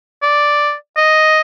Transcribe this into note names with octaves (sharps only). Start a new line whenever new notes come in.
D5
D#5